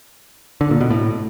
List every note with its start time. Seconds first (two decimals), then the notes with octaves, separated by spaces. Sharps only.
0.61 D3
0.71 A#2
0.81 B2
0.90 A2